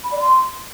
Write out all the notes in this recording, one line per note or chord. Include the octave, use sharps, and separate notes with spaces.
B5
D5
C6